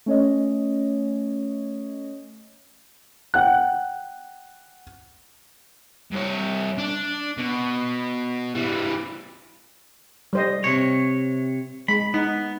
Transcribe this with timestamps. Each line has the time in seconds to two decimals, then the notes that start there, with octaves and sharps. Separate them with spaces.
0.06 A3 C#4 C#5 D#5
3.34 F#5 G5 F#6
6.12 G2 C#5
6.78 D4
7.38 B2
8.55 E3 G3
10.33 G3 C5 D#5
10.64 C3 C#5
11.88 G#3 B5
12.14 B3 D#4